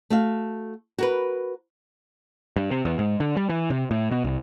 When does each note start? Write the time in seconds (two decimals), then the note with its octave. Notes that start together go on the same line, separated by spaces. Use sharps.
0.10 A3 F#4 F5
0.98 F#4 A#4 B4
2.56 G2
2.71 C3
2.85 E2
2.99 G#2
3.20 D3
3.37 G3
3.49 E3
3.70 C3
3.91 A2
4.11 B2
4.24 C2